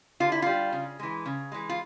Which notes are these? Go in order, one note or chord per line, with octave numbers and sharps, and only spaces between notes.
D3 F4
E4
G3 F4
C#3
E3 G#3
C#3
E3 G#3
F4